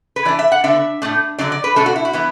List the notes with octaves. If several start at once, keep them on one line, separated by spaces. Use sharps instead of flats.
B4
E3 D4 D5
E5
F#5
D3 B3 D4 E5
A2 A3 D4
D3 F#3 D4 D5
D5
B4
B2 A3 D4 A4
F#4
E4
F#4
E3 B3 E4